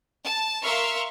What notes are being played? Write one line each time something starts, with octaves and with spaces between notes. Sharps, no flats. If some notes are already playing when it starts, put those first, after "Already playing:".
A5
A#4 E5 F5 C6 C#6 F6